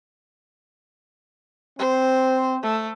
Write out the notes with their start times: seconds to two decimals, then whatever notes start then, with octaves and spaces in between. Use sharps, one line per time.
1.79 C4 C5
2.63 A3